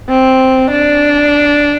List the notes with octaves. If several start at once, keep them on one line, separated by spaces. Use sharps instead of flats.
C4
D4